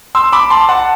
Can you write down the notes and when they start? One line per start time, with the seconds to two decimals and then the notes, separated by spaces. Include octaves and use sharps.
0.15 C6 E6
0.32 B5 D6
0.50 A5 C6
0.69 F#5 A5